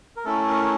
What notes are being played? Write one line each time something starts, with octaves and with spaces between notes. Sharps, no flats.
A#4
A3 C#4 E4 A4
A#4